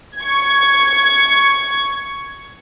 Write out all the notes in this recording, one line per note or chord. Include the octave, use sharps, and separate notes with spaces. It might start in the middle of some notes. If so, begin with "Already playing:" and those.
C#6 G#6